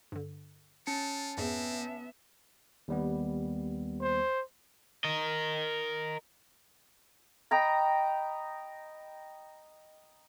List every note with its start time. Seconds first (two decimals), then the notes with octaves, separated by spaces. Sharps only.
0.12 G2 D3
0.87 C#4 F4 A5 C#7
1.37 F2 G#2 B3 C4 G#4 E5
2.88 D#2 G3 B3
4.02 C5
5.04 A#4 D#5
7.51 D#5 G5 A#5 B5